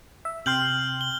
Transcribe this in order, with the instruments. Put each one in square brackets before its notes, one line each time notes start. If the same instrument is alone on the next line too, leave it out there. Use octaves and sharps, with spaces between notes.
[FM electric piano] E5
[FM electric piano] C3 G5 C6 [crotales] F6 G6 F#7
[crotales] G7